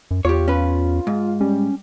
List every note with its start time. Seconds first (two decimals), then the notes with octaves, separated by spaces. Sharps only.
0.11 F#2
0.25 E2 F4 G4 C#5
0.48 C#4 B4
1.07 G#2
1.41 G3 C#4